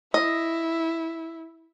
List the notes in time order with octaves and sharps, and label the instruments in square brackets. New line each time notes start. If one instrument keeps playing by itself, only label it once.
[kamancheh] E4 [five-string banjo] D#5